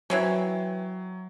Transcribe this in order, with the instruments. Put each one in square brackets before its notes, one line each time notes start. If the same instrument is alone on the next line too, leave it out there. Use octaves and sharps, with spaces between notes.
[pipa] E3 C4 C#4 [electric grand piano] F#3